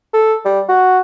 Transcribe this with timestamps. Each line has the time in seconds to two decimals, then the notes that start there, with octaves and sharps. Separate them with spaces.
0.13 A4
0.45 G3
0.69 F#4